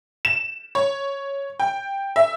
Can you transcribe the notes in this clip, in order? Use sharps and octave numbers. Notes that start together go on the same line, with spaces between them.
E7
C#5
G5
E5